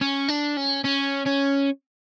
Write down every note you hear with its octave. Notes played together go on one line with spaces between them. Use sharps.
C#4
D4
C#4
C#4
C#4